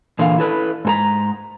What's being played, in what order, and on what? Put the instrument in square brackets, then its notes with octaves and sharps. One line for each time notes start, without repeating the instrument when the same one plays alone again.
[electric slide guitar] A#2 D3 E3 F5
E4 A4 B4
G#2 A4 A#5